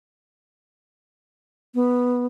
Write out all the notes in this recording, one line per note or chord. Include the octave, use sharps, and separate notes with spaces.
B3